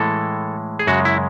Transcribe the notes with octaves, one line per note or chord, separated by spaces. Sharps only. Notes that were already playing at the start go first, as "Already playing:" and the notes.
Already playing: A2 E3 G#3 A4
G#4
F#2 C#3 G#3 F#4
E4